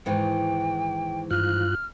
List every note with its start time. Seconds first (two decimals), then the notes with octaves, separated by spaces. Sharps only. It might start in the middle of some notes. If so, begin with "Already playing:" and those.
0.06 G#2 D#3 E3 G5
1.31 G2 F4 F6 F#6